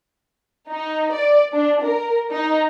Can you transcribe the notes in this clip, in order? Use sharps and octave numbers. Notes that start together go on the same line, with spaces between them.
D#4
D5
D4
A#4
D#4